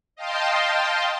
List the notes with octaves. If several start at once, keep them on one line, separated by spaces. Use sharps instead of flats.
D#5 F5 G5 A5 C6